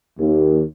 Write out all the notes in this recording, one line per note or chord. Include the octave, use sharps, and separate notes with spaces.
D#2